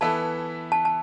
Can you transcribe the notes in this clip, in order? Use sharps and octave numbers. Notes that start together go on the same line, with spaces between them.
E3 B3 E4 A4 E5 A5
A5
A5